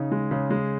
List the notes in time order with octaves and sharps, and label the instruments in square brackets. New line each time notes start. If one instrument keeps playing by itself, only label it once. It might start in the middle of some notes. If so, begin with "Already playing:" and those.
Already playing: [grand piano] C#3 D#4
G#3
C#3
G#3